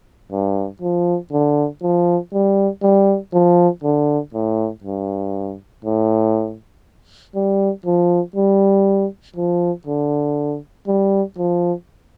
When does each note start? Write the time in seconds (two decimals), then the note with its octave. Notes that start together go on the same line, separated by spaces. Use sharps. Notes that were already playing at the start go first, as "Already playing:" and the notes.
0.31 G2
0.82 F3
1.32 D3
1.82 F3
2.33 G3
2.82 G3
3.33 F3
3.84 D3
4.34 A2
4.84 G2
5.85 A2
7.35 G3
7.85 F3
8.36 G3
9.36 F3
9.87 D3
10.87 G3
11.38 F3